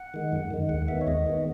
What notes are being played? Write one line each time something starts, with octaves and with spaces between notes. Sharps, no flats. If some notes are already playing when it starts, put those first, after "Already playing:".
Already playing: F#5
D#3 G#3
F#2
D#3 G#3
D#2 F#5
D#3 G#3 B3 E5
C#5
D#2 D#5
D#3 G#3 B3